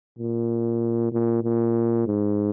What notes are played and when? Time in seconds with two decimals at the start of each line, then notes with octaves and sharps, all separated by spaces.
0.19 A#2
1.13 A#2
1.43 A#2
2.07 G#2